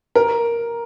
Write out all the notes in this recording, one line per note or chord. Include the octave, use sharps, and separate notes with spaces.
A#4